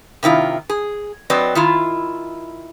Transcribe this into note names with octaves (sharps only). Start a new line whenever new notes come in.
C3 D#3 E4 F4
G#4
F#3 C4 B4 D5 D#5
D#3 E4 F4